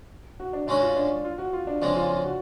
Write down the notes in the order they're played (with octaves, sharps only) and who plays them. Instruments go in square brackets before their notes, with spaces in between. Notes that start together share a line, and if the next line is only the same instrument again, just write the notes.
[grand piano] F#4
D4
[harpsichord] G#2 G#3 C#4 F#4 [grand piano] D4
[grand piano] F4
D4
F4
F#4
F4
D4
[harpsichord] F2 C#3 G#3 [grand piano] D4
[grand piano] F4
F4
F#4